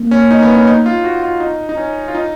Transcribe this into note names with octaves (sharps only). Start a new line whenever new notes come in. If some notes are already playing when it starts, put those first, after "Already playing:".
Already playing: A#3
C#4
D#4
B3
C#4
D#4
F4
F#4
F4
D#4
D#4
C#4
F4
D#4